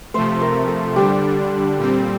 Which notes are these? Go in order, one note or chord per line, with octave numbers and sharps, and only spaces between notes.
C3 F3 A3 C5
A#4
A4
D3 G3 D4 G4
A#2 G3 C4